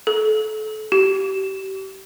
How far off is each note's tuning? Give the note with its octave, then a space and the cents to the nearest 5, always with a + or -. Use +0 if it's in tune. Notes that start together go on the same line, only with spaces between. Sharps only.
A4 -30
G4 -30